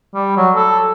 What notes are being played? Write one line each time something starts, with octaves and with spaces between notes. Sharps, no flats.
G3
F#3
A4